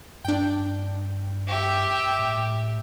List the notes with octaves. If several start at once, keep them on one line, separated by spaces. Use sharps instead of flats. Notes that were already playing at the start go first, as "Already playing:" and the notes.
G2 D4 G5
G4 E5
A2